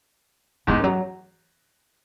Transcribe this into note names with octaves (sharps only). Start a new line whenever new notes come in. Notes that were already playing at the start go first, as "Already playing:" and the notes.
E2 G#2 E3
F#2
F#3